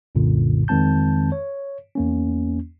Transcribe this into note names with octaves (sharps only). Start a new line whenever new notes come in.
C2 F#2 A#2 D3
F2 D#3 G#3 C4 A5 G6
C#5
E2 A#3 C#4